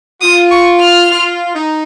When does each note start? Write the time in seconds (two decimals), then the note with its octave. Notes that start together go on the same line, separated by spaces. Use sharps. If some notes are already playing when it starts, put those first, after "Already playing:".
0.21 F4 D#6
0.51 C#6
0.80 F6
1.11 F4
1.55 D#4